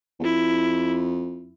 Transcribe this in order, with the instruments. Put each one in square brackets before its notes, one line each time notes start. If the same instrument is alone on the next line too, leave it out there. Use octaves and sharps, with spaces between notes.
[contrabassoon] E2
[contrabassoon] F2 [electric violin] E4